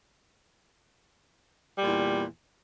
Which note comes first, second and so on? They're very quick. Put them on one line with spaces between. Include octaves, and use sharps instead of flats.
G3 A#2 E2